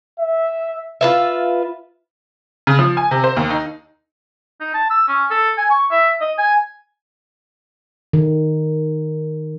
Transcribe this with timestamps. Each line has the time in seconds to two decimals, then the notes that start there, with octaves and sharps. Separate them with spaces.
0.19 E5
1.01 F4 B4 E5
2.67 C#3
2.79 F3
2.97 G#5
3.11 C3
3.24 C5
3.37 D#2
3.51 D#4
4.60 D#4
4.74 A5
4.90 E6
5.08 C#4
5.31 A4
5.58 G#5
5.71 C#6
5.91 E5
6.21 D#5
6.38 G#5
8.13 D#3